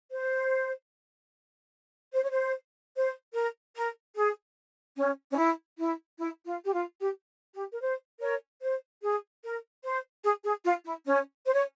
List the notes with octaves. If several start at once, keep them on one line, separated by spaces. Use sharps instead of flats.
C5
C5
C#5
C5
C5
A#4
A#4
G#4
C#4
C#4
E4
E4
E4
F4
G4
F4
G4
G4
A#4
C5
A#4 C#5
C5
G#4
A#4
C5
G#4
G#4
F4
E4
C#4
C5
C#5